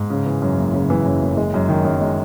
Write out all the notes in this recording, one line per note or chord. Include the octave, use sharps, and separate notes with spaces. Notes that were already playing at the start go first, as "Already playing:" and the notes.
Already playing: G#2
C#3
E3
F#2
F#1
C#3
E3
F#2
F#1
G#3
F#2
D#3
F#2
G#3